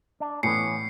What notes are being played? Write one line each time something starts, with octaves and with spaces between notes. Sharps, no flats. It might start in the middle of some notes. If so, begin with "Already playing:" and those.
D4
A2 E3 B3 C#4 C7 C#7